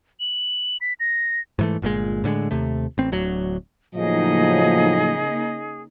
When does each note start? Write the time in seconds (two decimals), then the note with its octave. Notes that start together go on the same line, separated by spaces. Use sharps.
0.20 F#7
0.81 B6
1.00 A#6
1.59 G#2 E3 A3
1.82 G1 A#2 D#3 G#3
2.24 A2 D3 G3 G#3
2.51 D#2 C3 A3
2.98 A1 C4
3.12 D1 D2 F#3
3.95 A2 C#3 F3 F#3 A#3 D#4 G#4 D#5